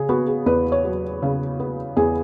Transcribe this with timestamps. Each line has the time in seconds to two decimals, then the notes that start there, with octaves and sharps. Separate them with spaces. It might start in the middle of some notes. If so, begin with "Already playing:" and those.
Already playing: C#3 G#4
0.09 B3 F#4
0.27 G#4
0.46 E2 B4
0.72 C#5
0.85 F#3
1.22 C#3
1.60 B3
1.97 E2 G#4